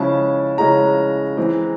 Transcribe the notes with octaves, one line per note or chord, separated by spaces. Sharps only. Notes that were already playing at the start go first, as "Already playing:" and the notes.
Already playing: C#3 F3 G#3 C#4 E4 A5
C#3 F3 G#3 C#4 E4 A#5
E3 G#3 C4